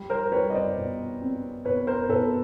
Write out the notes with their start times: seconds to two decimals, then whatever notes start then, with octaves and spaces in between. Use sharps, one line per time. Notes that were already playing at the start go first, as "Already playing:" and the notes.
Already playing: G3
0.10 A#4 C5
0.32 G3 B4 C#5
0.50 D#5
0.54 C5 D5
0.77 B2
1.21 C4
1.65 B2 B4 C#5
1.87 A#4 C5
2.09 B2 A4 B4